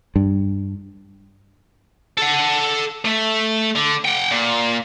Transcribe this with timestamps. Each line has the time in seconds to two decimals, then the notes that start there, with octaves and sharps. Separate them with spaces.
0.16 G2
2.18 A4 F#5
3.05 A3
3.75 D3
4.05 F#5 G5
4.31 A#2